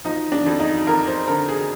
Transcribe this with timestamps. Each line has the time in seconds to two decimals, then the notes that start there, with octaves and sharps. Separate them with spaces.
0.05 F3 D#4
0.32 D4
0.46 F2
0.60 D#4
0.87 F2 A#4
1.07 C5
1.27 D3 A#4
1.49 G#4